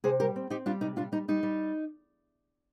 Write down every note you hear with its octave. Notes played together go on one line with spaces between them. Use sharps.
C3 G#4 C5
G3 G4 A#4
C4
C4 D#4 G4
G3 D4 F4
C3 D#4
G3 D4 F4
G3 D#4
G3 D#4
G3